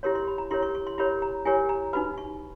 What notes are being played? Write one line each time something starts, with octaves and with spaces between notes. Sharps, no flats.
E4 G4 A#4 C#5 C6
C6
B5
A#5
E4 G4 A#4 C#5 C6
C#6
C#6
C6
E4 G4 A#4 C#5 B5
A#5
E4 G4 A#4 C#5 G#5
A#5
D#4 F#4 B4 B5
C#6